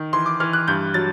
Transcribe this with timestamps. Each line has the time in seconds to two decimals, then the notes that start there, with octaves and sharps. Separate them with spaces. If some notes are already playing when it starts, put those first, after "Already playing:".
Already playing: D#3
0.13 E3 C6
0.26 D6
0.40 E3 F6
0.53 F#6
0.68 G2 G6
0.94 F#3 A6